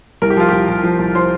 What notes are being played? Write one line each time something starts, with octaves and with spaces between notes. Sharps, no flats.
C2 A#4
G4
F3 F4
C2 G4
C2
F3
C2
F3 C5